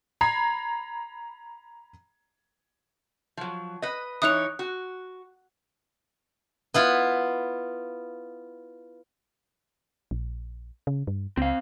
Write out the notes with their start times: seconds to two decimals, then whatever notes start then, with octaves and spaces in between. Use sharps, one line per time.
0.21 A#5 B5 G#6 C7
3.37 F3 F#3
3.82 B4 D#5
4.22 E3 D#4 C#5 D#6 F#6 F7
4.59 F#4
6.74 B3 E4 F4
10.11 A#1
10.87 C#3
11.07 G2
11.37 C#2 C4 F5